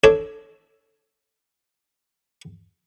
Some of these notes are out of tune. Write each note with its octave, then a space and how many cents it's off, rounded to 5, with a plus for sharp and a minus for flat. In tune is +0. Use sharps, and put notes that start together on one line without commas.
D4 +0 A4 +0 C#5 +0